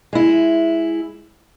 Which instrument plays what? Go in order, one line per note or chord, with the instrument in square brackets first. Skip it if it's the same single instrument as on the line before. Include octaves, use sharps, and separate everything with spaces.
[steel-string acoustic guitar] G#3 E4